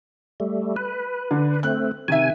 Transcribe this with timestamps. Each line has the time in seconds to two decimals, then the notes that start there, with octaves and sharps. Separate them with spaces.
0.40 G3 A3
0.76 B4
1.31 D3
1.63 A3 C4 F#6
2.08 C3 D#3 E5 G#5